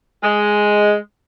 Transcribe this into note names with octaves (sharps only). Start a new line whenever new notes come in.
G#3